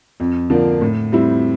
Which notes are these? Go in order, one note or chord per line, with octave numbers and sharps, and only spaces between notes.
F2
D3 F3 A#3 D4
A2
G3 C4 E4